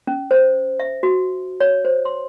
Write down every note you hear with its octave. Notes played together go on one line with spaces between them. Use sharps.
C#4
C5
E5
F#4
C#5
C5
C6